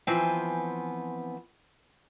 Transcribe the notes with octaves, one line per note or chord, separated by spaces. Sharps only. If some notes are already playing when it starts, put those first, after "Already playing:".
E3 F3 B3 C4 G#5